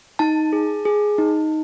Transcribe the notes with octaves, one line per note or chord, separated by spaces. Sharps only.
D#4 A5
G#4
G#4
D#4